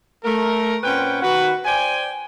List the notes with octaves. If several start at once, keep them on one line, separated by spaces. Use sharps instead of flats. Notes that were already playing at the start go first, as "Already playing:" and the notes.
A3 A#4
A#2 C4 C#4 B4 F#5 G5
D#3 F#4 B4
C5 D5 G5 G#5